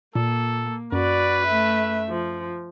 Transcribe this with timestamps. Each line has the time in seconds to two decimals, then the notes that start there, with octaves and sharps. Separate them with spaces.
0.16 A#2 A#3 A4
0.92 F#2 F#4 B4 D5
1.46 A3 E5
2.09 F3